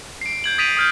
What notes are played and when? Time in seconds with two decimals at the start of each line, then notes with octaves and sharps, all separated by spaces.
0.21 C7 D7
0.44 G6 G#6 F#7
0.58 D#6 A6 B6 D7 D#7 F7
0.77 D#6 F6 G6